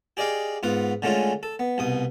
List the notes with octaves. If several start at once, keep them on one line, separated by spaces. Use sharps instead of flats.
G4 G#4 D5 D#5 F5 G5
G#2 B3 F4 F#5
D3 G#3 A3 C#4 F4
A4
B3
C2 B2 D#6